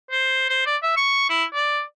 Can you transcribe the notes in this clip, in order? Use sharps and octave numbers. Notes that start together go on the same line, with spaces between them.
C5
C5
D5
E5
C#6
E4
D5